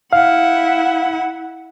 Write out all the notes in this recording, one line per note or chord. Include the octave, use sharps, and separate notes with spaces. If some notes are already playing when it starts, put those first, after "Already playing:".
E4 F5 F#5